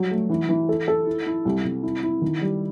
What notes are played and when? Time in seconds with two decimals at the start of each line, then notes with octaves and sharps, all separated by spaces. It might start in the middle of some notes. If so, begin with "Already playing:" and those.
Already playing: F#3 G3
0.11 A3
0.30 E3
0.49 E3
0.69 A4
0.88 A4
1.07 E4
1.26 E4
1.45 C2
1.65 C2
1.83 E4
2.03 E4
2.22 D#3
2.41 G3